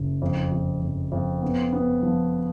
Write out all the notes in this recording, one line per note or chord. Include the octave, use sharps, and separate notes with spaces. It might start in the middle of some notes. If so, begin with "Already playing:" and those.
Already playing: F#1
F2
F2
F2
F2
B3
B3
F3